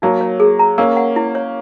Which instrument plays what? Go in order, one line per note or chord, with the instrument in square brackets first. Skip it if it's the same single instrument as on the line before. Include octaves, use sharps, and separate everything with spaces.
[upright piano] F#3 A#3 [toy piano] D#4
[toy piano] C#5
G#4
A#5
[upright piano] A#3 C#4 [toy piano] A#4
[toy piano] F#5
E4
C#5